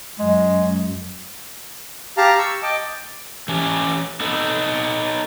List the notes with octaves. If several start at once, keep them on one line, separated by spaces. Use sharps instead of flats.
F#2 F#3 G#3
G4 F5 A5 A#5
C#6 E6
D#5 G5 A5 D6
E3 C#4 G4
B3 D#4 A4